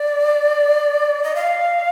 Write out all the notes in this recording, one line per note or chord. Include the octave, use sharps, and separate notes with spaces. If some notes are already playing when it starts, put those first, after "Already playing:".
Already playing: D5
D#5
F5